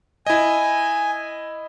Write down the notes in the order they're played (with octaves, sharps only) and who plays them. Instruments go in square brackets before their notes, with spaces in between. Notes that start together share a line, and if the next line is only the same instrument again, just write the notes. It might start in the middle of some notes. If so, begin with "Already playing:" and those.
[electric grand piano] E4 D#5 [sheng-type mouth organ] G#5